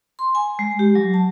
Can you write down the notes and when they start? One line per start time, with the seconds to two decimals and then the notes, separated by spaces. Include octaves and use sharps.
0.19 C6
0.35 G#5
0.59 G#3
0.79 G4
0.95 F#3
1.14 A5